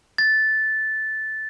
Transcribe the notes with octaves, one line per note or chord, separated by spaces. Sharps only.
A6